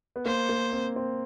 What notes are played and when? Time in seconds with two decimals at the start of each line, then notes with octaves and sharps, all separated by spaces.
0.16 B3
0.26 A#3 C5
0.49 A#3
0.73 C4
0.96 C4